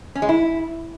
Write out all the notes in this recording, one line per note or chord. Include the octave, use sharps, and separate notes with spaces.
C#4
G#3
E4